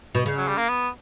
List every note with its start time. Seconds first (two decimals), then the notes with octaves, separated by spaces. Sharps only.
0.15 B2
0.26 C#3
0.37 F#3
0.48 G3
0.58 A#3
0.69 B3